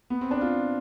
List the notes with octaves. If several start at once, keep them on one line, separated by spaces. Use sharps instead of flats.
B3
C4
D4
F4